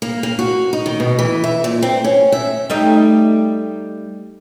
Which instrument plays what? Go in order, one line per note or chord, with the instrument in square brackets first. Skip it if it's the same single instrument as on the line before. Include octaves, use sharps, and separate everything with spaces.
[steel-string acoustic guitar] A#3
A#3
F#4
D#4
D#3
B2
E3
E5
A#2
C4
C#4
E5
[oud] G3 A3 D#4